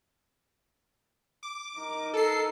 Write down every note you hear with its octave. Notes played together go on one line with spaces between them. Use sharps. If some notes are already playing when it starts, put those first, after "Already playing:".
D6
D#4 A#4
A4 C7